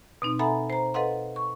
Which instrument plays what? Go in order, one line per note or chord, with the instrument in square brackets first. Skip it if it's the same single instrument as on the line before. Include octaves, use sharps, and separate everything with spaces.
[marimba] B2 C4 D#4
A4 E5 F#5 G#5 A#5 B5
C5 A#5
A4 B4 D#5 F5 F#5 C6
C#6